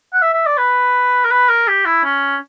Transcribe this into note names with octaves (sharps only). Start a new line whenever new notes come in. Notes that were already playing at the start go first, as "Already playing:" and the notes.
F#5
E5
E5
D5
B4
A#4
B4
A#4
G4
E4
C#4